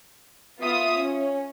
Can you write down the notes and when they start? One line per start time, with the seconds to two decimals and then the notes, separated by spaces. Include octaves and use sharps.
0.60 B3 F4 E5 D#6
0.98 C#4